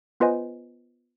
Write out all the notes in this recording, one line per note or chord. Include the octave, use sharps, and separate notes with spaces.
B3 F4 B4 C5 D#5 G#5